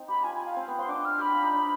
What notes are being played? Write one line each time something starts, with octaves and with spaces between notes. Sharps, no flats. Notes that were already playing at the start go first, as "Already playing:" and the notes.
Already playing: C4 D#4
G4 B5
F4 G#5
G#5
F5
C4
B3
C4 C6
D4 D6
F6
G4 B5
F4
D#4
D4